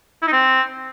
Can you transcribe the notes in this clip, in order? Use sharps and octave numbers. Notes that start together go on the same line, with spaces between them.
E4
D#4
C4